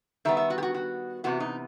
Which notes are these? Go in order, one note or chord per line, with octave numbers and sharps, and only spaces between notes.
D#3 G3 B3 E5
E5
F#4
G4
F#4
F#4
C3 E3 B3 F#4
D#4